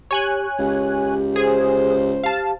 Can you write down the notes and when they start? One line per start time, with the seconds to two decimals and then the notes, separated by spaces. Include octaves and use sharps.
0.11 G4 C#5 G#5 F#6
0.59 C#2 G4
1.36 G#4 C5
2.24 G4 F5 A5